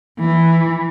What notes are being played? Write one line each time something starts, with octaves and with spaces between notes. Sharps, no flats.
E3